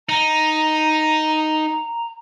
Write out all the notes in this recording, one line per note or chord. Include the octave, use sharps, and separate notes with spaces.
D#4 A#5